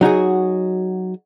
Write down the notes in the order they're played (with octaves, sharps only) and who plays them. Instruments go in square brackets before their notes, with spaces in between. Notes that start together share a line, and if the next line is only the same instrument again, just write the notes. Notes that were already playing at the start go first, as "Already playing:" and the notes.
[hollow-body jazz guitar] F#3 D#4 F#4 G#4